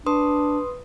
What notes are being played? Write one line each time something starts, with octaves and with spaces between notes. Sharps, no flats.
D4 B4 C6 D#6